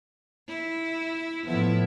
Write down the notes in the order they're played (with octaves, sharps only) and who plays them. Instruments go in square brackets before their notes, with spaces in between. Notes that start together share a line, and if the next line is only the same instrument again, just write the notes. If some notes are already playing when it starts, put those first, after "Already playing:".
[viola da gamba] E4
[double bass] A2 F3 [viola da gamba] B3 E4